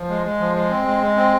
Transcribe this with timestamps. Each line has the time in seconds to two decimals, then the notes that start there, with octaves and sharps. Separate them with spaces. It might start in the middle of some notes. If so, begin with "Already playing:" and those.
Already playing: F3
0.08 G#3
0.24 G#3
0.39 F3
0.54 G#3
0.70 C4
0.85 G#3
1.00 G#3
1.16 C4